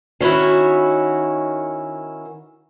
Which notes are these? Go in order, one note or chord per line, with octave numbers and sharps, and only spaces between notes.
D#3 C#4 E4 F#4